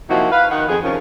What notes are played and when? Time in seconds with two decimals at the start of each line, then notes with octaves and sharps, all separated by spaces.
0.09 C3 F3 A#3 D#4 E4 F#4
0.31 B4 F5
0.51 D#3 F#5
0.68 F2 G#4
0.83 C3 D#3 F3 C#4